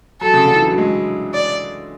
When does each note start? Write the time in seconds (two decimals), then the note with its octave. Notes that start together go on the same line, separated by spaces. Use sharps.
0.21 F#3 A4
0.34 C#3
0.45 D3
0.55 E3
0.67 F#3
0.78 G#3
1.34 D5